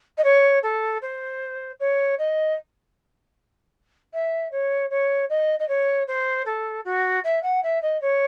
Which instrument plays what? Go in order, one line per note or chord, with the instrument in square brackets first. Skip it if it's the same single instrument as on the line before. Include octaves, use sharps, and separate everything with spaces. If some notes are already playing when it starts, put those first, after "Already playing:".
[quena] D#5
C#5
A4
C5
C#5
D#5
E5
C#5
C#5
D#5
D#5
C#5
C5
A4
F#4
E5
F#5
E5
D#5
C#5